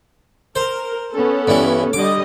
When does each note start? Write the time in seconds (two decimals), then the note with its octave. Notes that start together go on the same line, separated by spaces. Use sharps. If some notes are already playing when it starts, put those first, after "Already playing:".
0.56 A#4 C5
1.13 B3 C#4 A4
1.47 G2 E3
1.93 D3 G3 D#5 D6